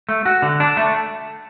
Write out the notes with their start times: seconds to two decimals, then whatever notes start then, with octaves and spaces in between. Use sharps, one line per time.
0.09 A3
0.26 F#4
0.42 D3
0.60 D4
0.77 A3